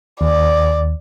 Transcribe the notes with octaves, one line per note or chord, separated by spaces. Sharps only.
D#2 D5